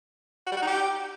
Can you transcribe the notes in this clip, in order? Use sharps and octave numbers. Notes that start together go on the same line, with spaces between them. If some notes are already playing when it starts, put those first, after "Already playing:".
F#4
G3
F#4
D#4
G4